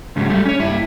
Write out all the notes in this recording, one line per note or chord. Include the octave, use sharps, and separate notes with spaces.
G#2 C#3 F#3 G#3
G3 A3
C#4 C#5
G2 E4